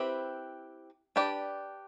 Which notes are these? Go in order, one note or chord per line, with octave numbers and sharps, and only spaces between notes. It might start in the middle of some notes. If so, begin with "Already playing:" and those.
Already playing: C4 E4 G4 B4
D4 G4 B4 D5